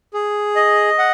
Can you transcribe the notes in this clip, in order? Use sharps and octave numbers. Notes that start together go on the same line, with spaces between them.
G#4
D#5
F#5